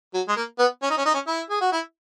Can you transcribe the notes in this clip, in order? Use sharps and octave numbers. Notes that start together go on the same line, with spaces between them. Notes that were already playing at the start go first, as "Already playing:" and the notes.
F#3
G#3
A#3
B3
C#4
D#4
C#4
D#4
C#4
E4
G#4
F#4
E4